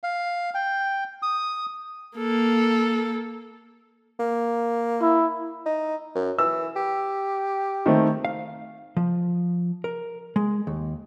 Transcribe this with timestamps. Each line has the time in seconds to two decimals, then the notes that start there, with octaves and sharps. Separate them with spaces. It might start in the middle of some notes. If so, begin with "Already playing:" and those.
0.03 F5
0.54 G5
1.22 D#6
2.17 A#3 A4
4.20 A#3
5.01 E4
5.66 D#4
6.15 F#2
6.39 E3 E6
6.76 G4
7.86 D#3 A3 C4
8.25 F5
8.97 F3
9.84 A#4
10.36 G#3
10.67 D#2